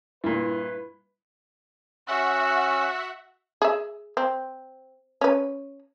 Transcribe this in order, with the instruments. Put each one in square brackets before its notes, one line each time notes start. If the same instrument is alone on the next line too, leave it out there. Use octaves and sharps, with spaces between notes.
[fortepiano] G2 A#2 [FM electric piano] E4 [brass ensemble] B4
[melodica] C#4 E6 [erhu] F#4 [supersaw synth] E5 F#5
[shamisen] G#4 E5
C4
C#4 B4